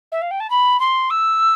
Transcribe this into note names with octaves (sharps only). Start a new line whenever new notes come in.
E5
F5
G5
A5
B5
C6
E6